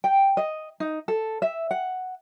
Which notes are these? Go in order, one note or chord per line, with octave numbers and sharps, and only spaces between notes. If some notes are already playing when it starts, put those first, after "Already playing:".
G5
D#5
D#4
A4
E5
F#5